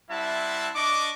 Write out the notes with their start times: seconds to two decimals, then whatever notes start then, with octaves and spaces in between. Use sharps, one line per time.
0.11 G3 C4 E4 E5 F#5 A5
0.75 D4 D#5 C#6 D6